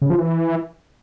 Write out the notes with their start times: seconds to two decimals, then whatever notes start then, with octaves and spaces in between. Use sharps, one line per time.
0.02 C#3
0.10 F3
0.18 E3